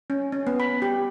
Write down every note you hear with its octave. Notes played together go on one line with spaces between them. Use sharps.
C#4
C#4
B3
B5
G4